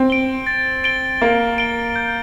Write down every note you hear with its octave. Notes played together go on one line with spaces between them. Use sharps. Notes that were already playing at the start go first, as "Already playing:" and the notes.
Already playing: C4
D7 G7
A6
D7 G7
A#3 A6
D7 G7
G6